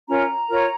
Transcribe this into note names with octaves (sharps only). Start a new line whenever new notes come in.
C#4 F4 A#4 C#5 A#5
F4 A#4 C#5